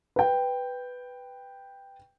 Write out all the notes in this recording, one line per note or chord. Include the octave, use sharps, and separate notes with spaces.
B4 G5